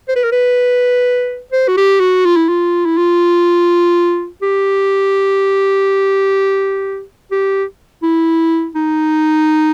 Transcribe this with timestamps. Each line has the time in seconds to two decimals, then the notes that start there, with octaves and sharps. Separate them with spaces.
0.09 C5
0.16 B4
0.24 A#4
0.32 B4
1.53 C5
1.68 F#4
1.77 G4
2.00 F#4
2.25 F4
2.36 E4
2.49 F4
2.86 E4
2.97 F4
4.42 G4
7.32 G4
8.03 E4
8.75 D#4